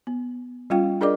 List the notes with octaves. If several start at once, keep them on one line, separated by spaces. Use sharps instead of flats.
B3
G3 C#4 F4 F5 G5
D4 G#4 A#4 D5 D#5 D6